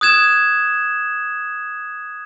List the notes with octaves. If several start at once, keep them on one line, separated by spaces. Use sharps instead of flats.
D#6 F#6 G#6 E7